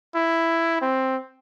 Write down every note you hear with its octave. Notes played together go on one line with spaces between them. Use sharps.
E4
C4